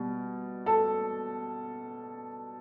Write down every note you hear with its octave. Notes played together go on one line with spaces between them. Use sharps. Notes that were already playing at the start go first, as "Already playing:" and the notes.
Already playing: B2 G3
A4